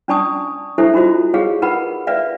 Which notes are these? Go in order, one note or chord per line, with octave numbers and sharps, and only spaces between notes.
C#4 D4 D5 A5 C#6 D#6
D4 E4 G4 A4 C5 E5
D#4 F4 F#4 C5 D#5
G4 G#4 C#5 D#5 F5
D#4 A#4 B4 F#5 B5
B4 D5 E5 F5